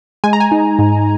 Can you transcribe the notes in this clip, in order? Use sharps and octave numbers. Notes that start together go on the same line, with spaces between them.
G#3 G#5
A#5
G#5
D#4
G#2